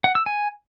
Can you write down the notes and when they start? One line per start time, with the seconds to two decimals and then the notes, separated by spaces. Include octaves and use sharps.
0.04 F#5
0.15 E6
0.26 G#5